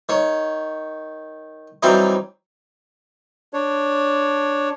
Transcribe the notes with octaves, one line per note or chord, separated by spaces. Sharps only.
D#3 C#5
E3 F#3 G3 C4 D#4
D4 C#5